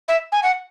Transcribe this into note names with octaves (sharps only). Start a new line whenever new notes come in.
E5
G#5
F#5